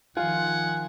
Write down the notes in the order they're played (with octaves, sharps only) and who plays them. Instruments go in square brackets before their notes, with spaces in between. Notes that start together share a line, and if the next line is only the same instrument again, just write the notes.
[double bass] D#3 F3 [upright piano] F4 [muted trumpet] F#5 [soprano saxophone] G#5